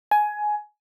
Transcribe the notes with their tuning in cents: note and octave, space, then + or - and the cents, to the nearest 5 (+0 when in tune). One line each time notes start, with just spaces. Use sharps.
G#5 +15